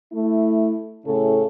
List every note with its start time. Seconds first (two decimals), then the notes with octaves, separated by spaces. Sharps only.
0.13 A3 E4
1.05 A2 C#3 C#4 E4 A4